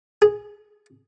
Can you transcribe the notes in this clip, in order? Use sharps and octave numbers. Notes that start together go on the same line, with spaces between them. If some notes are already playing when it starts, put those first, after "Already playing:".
G#4